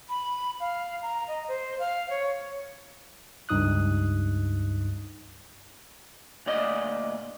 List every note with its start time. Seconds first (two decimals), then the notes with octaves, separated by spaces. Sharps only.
0.09 B5
0.60 F5
1.02 A#5
1.28 D#5
1.48 C5
1.79 F5
2.10 C#5
3.49 C#2 G2 D#4 D#6 F#6
6.46 D2 A#2 D5 D#5